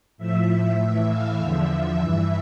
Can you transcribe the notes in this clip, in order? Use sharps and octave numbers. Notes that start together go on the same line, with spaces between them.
A2 F3 E5
A2 E3 E5
F5
E2 D3 F3 E5
E5
G2 E3